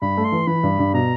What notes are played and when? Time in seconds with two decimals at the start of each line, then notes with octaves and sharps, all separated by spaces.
0.02 G2 B5
0.18 A3
0.25 C6
0.32 E3
0.47 E3 B5
0.63 G2
0.79 G2
0.94 B2 A#5